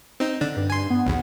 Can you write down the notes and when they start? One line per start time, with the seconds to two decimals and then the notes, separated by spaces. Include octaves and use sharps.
0.20 C4 D#4
0.41 D3 D4
0.57 G2
0.70 G#5 C6
0.90 B3
1.06 B1 E2